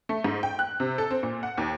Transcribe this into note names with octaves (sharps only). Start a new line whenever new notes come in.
A3
G#2
G5
F#6
C3
A4
C4
A#2
F#5
D#2